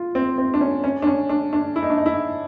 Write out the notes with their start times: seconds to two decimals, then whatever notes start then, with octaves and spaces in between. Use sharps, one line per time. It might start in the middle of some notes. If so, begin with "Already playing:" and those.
Already playing: F4
0.15 C4
0.38 C4
0.54 D4
0.61 C#4
0.84 C#4
1.02 D4
1.07 C#4
1.29 D4
1.53 D4
1.76 E4
1.83 D#4
1.90 D4
1.98 D#4
2.06 E4